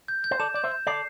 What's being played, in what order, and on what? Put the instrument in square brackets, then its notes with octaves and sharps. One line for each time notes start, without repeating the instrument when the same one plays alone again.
[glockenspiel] G6
G6
[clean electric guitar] C5
[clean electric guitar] A4 D5 [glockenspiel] E7
[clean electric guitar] D5 [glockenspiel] G6
[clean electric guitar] C5 E5
[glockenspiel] G6
[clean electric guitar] A4 D5 [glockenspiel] C7